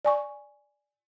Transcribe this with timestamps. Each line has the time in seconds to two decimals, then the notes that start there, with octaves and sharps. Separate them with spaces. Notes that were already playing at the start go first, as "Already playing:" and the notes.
0.05 D5 G#5 C#6